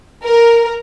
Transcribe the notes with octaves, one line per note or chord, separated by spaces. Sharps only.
A#4